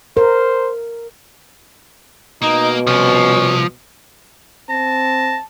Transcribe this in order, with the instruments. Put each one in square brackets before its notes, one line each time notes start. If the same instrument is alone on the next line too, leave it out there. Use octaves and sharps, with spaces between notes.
[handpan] A#4 [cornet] C5
[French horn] B2 [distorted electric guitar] A#3 [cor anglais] D#4
[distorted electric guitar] C2 [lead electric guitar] F3 [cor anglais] C#4
[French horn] C4 [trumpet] A5 [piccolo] A#6